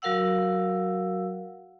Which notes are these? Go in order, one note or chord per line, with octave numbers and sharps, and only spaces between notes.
F#3 F#4 A#4 F5 F#5 E6